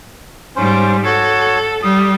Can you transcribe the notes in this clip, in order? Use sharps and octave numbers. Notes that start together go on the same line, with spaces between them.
G#2 G3 C#4 C5
F#4 A4 C#5
G3 D#6